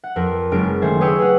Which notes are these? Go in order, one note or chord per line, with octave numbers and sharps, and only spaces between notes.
F#5
F2 A#4
F#1 G#3 C#4 A#4 D7
D#3 A3 C5 G#5
G#4 B4 C#5 G5 D#6 E6
G#4 C#5 F#5